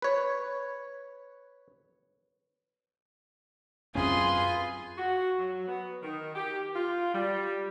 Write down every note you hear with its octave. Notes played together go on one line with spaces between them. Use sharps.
B4 C#5
F#2 C4 C#4 F4 G#4 B4 C6
F#4
F#3
B3
D#3
G4
F4
G3